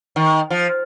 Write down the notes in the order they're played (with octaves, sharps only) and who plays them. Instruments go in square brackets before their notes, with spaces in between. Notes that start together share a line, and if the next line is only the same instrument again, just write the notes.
[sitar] D#3
F3